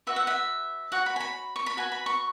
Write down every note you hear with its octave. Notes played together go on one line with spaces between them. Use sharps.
F#4 B4 E5
F#5
E5
F#4 C#5 F#5
B5
G#5
B5
C#6
B5
F#4 B4 G#5
B5
C#6